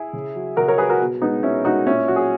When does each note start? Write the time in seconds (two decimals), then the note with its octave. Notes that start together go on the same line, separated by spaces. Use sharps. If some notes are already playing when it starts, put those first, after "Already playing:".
Already playing: E4 G#4
0.13 C#3
0.35 F#3
0.57 C#3 F#4 A#4
0.68 A#4 C#5
0.78 F#3 G#4 B4
0.90 F#4 A#4
1.01 B2
1.22 G#3 B3 D#4
1.43 B2 C#4 E4
1.65 G#3 D#4 F#4
1.86 A#2 C#4 E4
2.08 F#3 F#4
2.16 G#4